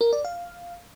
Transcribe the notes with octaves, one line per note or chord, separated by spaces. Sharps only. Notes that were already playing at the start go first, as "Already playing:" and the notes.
A#4
D5
F5